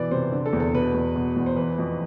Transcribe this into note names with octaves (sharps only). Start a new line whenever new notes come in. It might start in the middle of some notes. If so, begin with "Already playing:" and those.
Already playing: B2 E3 D5
C3 C5
D3
A4
E2
A4
B2 B4
E2
B2
E2
C5
E3 B4
F2